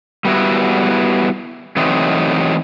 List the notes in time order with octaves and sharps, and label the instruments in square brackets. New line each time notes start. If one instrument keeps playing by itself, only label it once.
[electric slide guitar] G3 B3 E4 F#4
E3 F#3 A3 C4 D#4